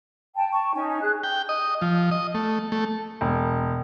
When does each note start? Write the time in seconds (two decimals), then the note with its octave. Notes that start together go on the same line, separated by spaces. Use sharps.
0.35 G5 A5
0.52 A5 C#6
0.74 C#4 D#4 G#5
0.89 G#5
1.01 G#4 F#6
1.24 G5
1.49 D#5
1.81 F3
2.11 D#5
2.35 A3
2.72 A3
3.21 E1